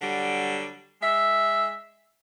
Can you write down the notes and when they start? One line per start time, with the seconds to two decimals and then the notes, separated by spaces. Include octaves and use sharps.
0.02 D3 F#3 G3
1.02 G#3 E5